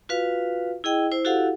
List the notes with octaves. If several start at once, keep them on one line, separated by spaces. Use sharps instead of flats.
F4 F#4 B4 F5
E4 G#4 D#5 G5
E4 C5
E4 F#4 G4 A4 F5 F#5